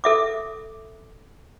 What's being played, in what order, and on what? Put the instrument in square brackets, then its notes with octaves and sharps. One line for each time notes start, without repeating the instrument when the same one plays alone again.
[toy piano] A4 E5 D6